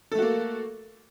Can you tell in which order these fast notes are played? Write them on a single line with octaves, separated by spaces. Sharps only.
A4 A3 F#4 A#3